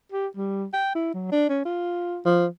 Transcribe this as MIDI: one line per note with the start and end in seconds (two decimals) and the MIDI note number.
0.12 0.27 67
0.37 0.65 55
0.73 0.93 79
0.95 1.12 64
1.14 1.28 54
1.32 1.48 62
1.49 1.63 61
1.65 2.19 65
2.25 2.46 53